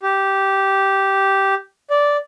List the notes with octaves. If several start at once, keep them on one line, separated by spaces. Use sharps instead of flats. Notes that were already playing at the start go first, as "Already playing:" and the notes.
G4
D5